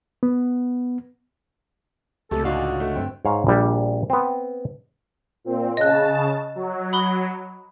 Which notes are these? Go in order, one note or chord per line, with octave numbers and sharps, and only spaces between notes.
B3
C#2 C3 A3 G4 A4
A2 D3 D4 D#4 F4 F#4 F5
D3 A3
G2 C4 G5
G#2 C#5 F5
A#1 G3
B3 C4
A#2 C4
C#3 D#5 A5 F#6
F#3
B5 D#6 G7